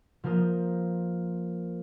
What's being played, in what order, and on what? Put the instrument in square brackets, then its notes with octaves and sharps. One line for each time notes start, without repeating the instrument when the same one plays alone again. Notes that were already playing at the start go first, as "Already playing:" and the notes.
[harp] F3 A#3 A#4 C5 D#6